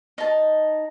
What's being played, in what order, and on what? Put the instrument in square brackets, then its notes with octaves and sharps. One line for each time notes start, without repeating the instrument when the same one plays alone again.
[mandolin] D#4 A5